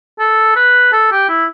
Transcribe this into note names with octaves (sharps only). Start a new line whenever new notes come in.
A4
B4
A4
G4
E4